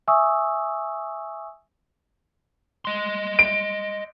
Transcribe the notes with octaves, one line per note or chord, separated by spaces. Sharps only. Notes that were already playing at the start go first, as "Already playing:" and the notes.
E5 G#5 C#6 D#6 E6
D#5 C6
D7